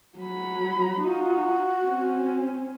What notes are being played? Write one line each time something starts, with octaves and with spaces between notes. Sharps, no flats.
F#3 B5
D#4 F4 F#4
C4 C#4